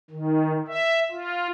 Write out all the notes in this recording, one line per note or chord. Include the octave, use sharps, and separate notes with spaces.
D#3
E5
F4